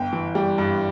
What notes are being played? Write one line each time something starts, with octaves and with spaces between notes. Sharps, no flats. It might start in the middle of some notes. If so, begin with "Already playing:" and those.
Already playing: G1 G5
E3
G3 G5
G2